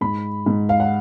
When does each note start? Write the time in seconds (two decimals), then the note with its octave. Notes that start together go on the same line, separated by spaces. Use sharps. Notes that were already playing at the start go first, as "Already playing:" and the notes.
0.01 G#2 B5
0.46 G#2
0.69 F5
0.80 F#5